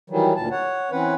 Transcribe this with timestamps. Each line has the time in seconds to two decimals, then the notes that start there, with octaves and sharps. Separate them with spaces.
0.10 D#3 E3 F#3 G3
0.36 D2 A#2 A5
0.51 C#5 F#5
0.91 E3 C4 C#4 B4 F#5